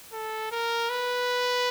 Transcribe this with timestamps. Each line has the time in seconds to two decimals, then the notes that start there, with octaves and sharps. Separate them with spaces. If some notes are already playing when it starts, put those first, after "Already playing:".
0.13 A4
0.52 A#4
0.90 B4